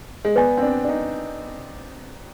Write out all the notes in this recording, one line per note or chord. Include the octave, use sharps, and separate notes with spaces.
G#3
B3 B4 D5 G#5
C4
D4
D4
D#4